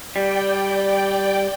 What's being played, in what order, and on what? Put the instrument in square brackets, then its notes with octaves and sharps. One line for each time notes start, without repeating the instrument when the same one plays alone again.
[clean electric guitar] G3 [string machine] D5 G5